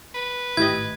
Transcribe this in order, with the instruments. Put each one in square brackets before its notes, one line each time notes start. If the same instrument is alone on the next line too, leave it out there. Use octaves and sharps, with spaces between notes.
[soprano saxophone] B4
[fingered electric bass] G#1 A2 [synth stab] E4 G4 D#5 [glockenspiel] G#6